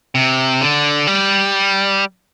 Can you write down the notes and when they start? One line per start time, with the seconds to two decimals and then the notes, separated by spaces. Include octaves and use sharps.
0.15 C3
0.61 D3
1.07 G3